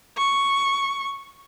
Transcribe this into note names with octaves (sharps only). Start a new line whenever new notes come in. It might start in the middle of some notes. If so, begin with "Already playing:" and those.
C#6